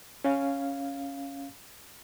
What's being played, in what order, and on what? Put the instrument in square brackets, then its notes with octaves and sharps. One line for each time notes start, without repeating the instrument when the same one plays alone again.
[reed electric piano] C#4 F5